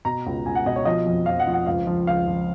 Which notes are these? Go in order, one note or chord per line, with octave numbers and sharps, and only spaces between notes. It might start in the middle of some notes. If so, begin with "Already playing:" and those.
B2 A#5
C#2
C#2 G#5
F#5
B2 D#5
C#5
F3 D#5
F2
F2 F5
F#5
F3
F#5
C#2 F5
F3
C#2 F5
F3